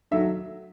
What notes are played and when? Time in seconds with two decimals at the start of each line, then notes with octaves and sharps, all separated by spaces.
0.11 D#3 F#3 A3 E5